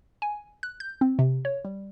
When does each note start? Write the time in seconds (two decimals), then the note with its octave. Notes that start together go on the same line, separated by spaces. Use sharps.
0.22 G#5
0.63 F#6
0.80 G6
1.01 C4
1.19 C3
1.45 C#5
1.65 G3